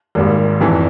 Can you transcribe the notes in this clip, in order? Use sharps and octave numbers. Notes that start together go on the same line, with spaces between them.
G#1 G#2 G3 A#3
F1 F2 E3